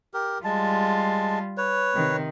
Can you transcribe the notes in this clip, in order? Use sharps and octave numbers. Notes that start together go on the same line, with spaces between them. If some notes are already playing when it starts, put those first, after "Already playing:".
G4 A#4
G3 G#3 F4 A5
B4 C#5
C3 D#3